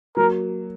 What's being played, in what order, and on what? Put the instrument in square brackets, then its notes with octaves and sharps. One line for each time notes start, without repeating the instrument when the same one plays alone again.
[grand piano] F#3 A#3 [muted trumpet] A#4